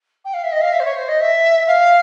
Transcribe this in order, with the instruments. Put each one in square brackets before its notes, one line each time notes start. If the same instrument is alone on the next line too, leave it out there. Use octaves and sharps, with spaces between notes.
[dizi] G5
F5
E5
D#5
F5
E5
C5
C#5
C5
D#5
E5
F5